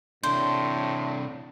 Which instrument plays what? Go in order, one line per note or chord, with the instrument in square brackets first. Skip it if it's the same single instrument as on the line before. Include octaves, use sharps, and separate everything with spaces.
[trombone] A2 [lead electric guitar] C3 D4 [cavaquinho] C5